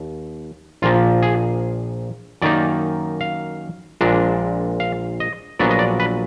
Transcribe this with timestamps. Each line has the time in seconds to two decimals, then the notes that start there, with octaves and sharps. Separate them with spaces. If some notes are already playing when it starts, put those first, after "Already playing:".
Already playing: D#2
0.82 A#1 A#2 F3 A#3 F4
1.22 G#4
2.42 F#2 D#3 A#3 D#4 D5
3.21 F5
4.01 A#1 A#2 G#3 D4
4.80 F5
5.20 D#5
5.59 A#1 A#2 F#3 B3 D4 D5
5.70 D#5
5.79 D5
6.00 B4